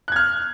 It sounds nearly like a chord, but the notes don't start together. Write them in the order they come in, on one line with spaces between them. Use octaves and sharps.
F#6 G#6 F6